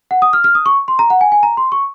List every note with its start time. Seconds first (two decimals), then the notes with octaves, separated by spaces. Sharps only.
0.11 F#5
0.22 D#6
0.33 F6
0.44 F6
0.55 D#6
0.66 C#6
0.88 C6
0.99 A#5
1.10 F#5
1.21 G#5
1.32 G#5
1.43 A#5
1.57 C6
1.72 C#6